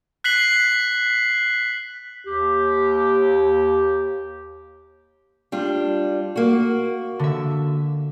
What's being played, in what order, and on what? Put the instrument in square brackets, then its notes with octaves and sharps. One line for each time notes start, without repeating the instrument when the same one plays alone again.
[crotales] F#6 B6 C7 F#7
[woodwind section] D#2 G4
[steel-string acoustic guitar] G3 D4 F4
A#3 F#4
[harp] D3 E5